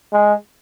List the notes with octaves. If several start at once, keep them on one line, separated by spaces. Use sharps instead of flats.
G#3